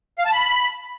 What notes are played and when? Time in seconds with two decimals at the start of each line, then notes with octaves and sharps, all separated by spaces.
0.19 F5
0.26 A5
0.33 B5